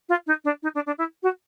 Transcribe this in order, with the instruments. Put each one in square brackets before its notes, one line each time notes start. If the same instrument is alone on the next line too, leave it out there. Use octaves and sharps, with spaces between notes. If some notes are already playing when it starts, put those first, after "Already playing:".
[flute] F4
D#4
D4
D#4
D4
D4
E4
F#4